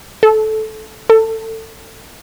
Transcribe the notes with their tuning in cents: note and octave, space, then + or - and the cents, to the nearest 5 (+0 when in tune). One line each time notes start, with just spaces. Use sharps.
A4 -15
A4 +25